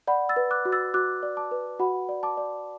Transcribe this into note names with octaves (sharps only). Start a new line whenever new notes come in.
D5 F#5 B5
E6 A6
B4
D6 F#6
F#4
E6 A6
F#4 D6 F#6
D5
A5 D6
B4
F#4 F#5 B5
D5
A5 D6
D5